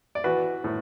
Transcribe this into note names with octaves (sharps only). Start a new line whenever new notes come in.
D5
E3 F#4 B4
A2